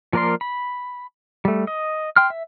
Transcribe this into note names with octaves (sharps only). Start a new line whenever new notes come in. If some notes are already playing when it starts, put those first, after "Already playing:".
F3 A#3 A#4 D5 C6
B5
G3 A3
D#5
G5 C6 F6
E5